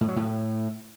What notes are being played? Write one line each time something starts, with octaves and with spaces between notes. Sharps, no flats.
A2
F#3
A2